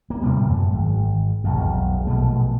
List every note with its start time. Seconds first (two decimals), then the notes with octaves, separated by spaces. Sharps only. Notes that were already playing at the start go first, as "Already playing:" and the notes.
0.10 A#3
0.22 A2 C3 G3 B3
0.44 F#2 E3 A3
0.73 G#1
1.44 E1 B1 F2
2.07 A#1 B2 A3